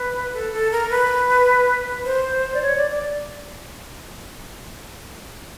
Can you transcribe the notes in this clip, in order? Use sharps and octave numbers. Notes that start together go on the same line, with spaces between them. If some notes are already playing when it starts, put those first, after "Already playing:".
Already playing: B4
A4
A4
A#4
B4
C5
D5
C#5
D5
D5